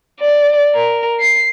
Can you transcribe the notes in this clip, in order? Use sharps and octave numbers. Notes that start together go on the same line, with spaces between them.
D5
A#4
C7